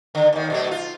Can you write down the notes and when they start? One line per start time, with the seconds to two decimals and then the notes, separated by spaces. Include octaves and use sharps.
0.15 D3
0.33 D#2 D#3
0.50 B2 F#3 A3
0.71 F4